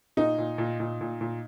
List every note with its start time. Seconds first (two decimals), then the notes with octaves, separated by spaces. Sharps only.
0.17 A#2 D#4
0.38 A#2
0.58 A#2
0.80 A#2
1.01 A#2
1.21 A#2